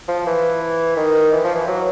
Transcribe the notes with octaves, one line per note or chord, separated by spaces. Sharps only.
F3
E3
D#3
E3
F3
E3
F#3